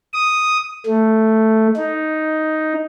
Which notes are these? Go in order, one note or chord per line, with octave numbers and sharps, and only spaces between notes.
D#6
A3
D#4